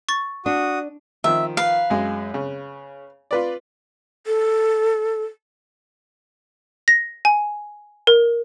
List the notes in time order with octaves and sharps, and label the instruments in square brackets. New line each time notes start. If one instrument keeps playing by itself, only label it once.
[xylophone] C#6 A6
[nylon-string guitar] D4 [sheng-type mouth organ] F#4 D#6
[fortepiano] D#3 F3 [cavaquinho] E5
[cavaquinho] B4 F5
[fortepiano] F#2 G#3
C#3
F4 B4 D5
[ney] A4
[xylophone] A#6
G#5
A#4